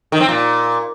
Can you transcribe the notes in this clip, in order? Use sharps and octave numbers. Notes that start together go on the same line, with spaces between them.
D#3
C4
A#2